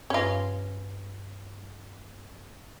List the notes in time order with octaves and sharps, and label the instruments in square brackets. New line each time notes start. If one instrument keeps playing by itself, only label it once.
[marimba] G2 B4 A#6 [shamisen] C#4 F4